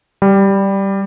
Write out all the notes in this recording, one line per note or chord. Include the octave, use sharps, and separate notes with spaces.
G3